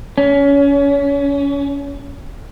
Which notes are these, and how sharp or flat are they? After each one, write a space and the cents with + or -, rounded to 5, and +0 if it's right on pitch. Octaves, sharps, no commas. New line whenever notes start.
C#4 +25